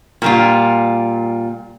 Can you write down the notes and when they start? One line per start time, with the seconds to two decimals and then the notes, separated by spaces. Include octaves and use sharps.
0.22 A#2 G3 F4